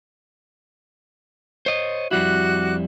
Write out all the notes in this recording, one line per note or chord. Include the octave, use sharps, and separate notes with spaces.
C5 C#5 D#5
F2 G3 E4 F#4 D6 F#6